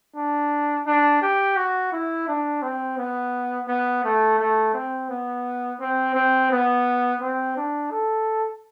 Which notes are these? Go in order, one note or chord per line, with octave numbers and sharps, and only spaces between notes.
D4
D4
G4
F#4
E4
D4
C4
B3
B3
A3
A3
C4
B3
C4
C4
B3
C4
D4
A4